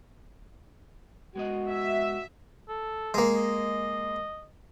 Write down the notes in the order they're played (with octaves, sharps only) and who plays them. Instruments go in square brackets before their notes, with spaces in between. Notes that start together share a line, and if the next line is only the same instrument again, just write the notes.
[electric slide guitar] G#3 B3 D#5 [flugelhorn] F#4
[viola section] E5
[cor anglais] A4
[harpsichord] G#3 A#3
[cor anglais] D#5